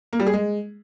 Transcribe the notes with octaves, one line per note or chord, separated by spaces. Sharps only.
A#3
G3
G#4
G#3